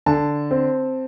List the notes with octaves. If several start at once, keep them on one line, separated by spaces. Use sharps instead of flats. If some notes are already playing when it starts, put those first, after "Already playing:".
D3 A5
C4